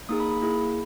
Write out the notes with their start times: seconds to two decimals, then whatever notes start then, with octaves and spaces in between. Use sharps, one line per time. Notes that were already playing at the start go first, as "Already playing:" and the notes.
0.09 A#3 D#4 G#4 D#6
0.20 B5
0.31 B5
0.42 A#3 E4 G#4